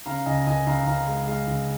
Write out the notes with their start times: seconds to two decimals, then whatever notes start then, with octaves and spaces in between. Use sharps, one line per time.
0.06 C#3 F5 A#5
0.26 C#2 D#5 G#5
0.47 C#2 D#5 G#5
0.67 C#2 F5 A#5
0.87 C#2 F5 A#5
1.07 G#3 F5
1.27 G#3 F5
1.47 C#2